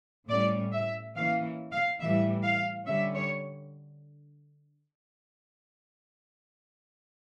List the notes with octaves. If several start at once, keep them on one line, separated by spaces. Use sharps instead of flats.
A2 G3 C#4 D5
E5
E3 A#3 C#4 F5
F5
A2 E3 G3 E5
F5
D3 G3 C#4 E5
C#5